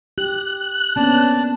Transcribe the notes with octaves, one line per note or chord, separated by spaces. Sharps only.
G4 F#6
A#3 B3 C#4 D4 A5